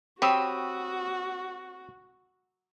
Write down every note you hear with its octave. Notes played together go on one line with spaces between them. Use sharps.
C4 F#4 G4 C#5 G5 B5 D#6 E6